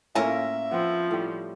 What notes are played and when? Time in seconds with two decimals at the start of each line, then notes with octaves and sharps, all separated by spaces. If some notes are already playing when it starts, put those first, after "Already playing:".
0.15 A2 A#3 C#4 F4 A#4 E5
0.72 F3 B3 C4
1.11 A2 G3